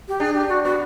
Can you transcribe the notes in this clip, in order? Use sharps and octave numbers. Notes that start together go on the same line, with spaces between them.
G4
D4 G#4
G4
F#4
B3 F#4